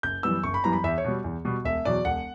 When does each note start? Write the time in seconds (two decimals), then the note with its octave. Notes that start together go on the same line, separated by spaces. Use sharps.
0.03 F#1 G6
0.23 F#2 E3 G3 B3 E6
0.43 F#1 C#6
0.54 B5
0.64 F#2 E3 G3 B3 A#5
0.73 B5
0.84 E2 E5
0.98 C#5
1.05 B2 G3
1.24 E2
1.45 B2 G3
1.65 E1 E5
1.85 E2 B2 F#3 D5
2.05 E1 F#5